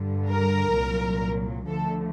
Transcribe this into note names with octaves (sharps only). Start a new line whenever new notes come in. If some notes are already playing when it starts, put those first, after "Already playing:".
Already playing: G2 D3 G3
A#4
C2 A#2 F#3
D2 D3 F3 A3 A4